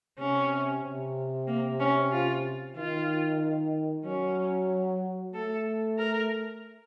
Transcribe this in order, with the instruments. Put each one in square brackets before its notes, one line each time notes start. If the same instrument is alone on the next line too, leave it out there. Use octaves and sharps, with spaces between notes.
[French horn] C3 [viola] C#4
[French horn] C3
[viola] A#3
C#4
F4
[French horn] D#3 [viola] F4
[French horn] F#3 [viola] C#4
[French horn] A3 [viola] A4
[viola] A#4